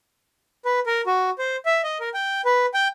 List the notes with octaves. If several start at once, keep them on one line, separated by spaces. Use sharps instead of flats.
B4
A#4
F#4
C5
E5
D#5
A#4
G5
B4
G5